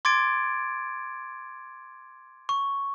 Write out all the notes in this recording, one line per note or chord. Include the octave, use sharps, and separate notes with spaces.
C6 D6 G#6 A6 D7
C#6